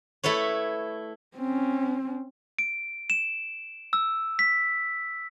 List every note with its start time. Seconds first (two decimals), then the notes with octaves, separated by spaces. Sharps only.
0.23 A3 E4 A4 B4 C#5
1.36 C4 C#4
2.59 D7
3.10 E7
3.93 E6
4.39 B6